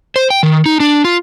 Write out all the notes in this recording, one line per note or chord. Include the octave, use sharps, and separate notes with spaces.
C5
G5
D#3
D#4
D4
F4